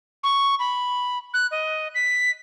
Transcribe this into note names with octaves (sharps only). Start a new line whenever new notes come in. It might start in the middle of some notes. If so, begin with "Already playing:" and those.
C#6
B5
F#6
D#5
B6